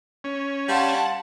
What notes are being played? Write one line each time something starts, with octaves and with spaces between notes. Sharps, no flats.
C#4
G3 F5 F#5 A5 C6